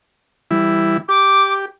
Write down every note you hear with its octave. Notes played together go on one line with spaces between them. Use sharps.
E3 G3 E4
G4 D6